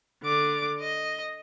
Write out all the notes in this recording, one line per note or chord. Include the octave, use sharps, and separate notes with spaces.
D3 D6
D#5